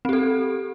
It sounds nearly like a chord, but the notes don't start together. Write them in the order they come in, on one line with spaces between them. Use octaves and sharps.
C4 G4 A4